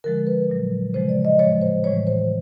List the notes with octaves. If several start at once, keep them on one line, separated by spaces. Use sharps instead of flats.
D3 F3 G#3 A#4
B4
A#2 F#3
C#3 F3 G#3 C5
D5
D#5
A2 F3 G#3 C#5
C5
A2 E3 G3 C#5
C5